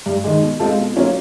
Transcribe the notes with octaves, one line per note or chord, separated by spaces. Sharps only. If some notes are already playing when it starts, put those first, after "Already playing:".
G2
D#3 G#3
B2
G#3 C4 F4 A4
B2
F#3 A#3 C#4 F4